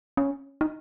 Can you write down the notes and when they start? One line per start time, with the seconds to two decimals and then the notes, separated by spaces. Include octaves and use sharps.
0.17 C#4
0.61 D#4